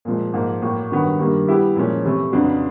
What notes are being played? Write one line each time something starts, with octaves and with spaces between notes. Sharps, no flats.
A#2 F3 G#3
G#2 F3 A#3
A2 F#3 A#3
G2 D#3 F#3 B3
G2 D#3 G3 A#3
G3 B3 E4 G4
A#2 F3 G#3 C#4
C3 E3 A3
F2 C#3 F#3 B3 D4